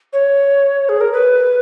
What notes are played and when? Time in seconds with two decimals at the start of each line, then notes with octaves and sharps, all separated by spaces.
0.13 C#5
0.89 G#4
1.01 A#4
1.13 B4